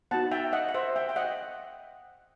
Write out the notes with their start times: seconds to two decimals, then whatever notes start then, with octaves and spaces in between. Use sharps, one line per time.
0.11 B3 D#4 F#4 F#5 A5
0.31 E5 G5
0.53 D#5 F#5
0.69 F#5
0.74 C5 E5
0.96 E5 G5
1.09 G5
1.16 D#5 F#5